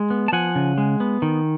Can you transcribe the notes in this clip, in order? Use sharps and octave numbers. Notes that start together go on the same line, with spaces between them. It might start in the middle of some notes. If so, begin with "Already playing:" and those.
Already playing: G#3
B3
A5
F3 F#5 G#5
C#3
G#3
B3
D#3